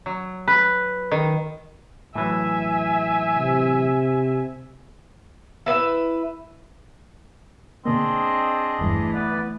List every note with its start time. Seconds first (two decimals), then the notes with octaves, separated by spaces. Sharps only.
0.06 F#3
0.48 B4
1.11 D#3
2.16 A2 E3 F#3 E5 G#5
3.35 C3
5.66 E4 B4 D#5 E5
7.85 B2 D3 A#3 C4 D4 G#4 D#5
8.79 G1 E2 G2 E3 A3
9.14 B3 B4 D5